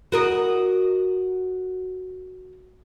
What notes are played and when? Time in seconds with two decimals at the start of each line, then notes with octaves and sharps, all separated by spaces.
0.12 F#4 A#4 D#5